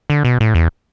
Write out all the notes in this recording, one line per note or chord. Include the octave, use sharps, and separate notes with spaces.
D3
B2
A2
E2